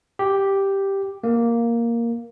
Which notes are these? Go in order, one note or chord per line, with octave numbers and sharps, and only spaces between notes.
G4
A#3